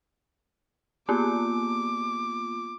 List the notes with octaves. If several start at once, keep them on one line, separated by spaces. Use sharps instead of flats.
A#3 B3 F4 D6